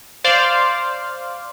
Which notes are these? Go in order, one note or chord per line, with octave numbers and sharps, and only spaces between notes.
C5 D5 F5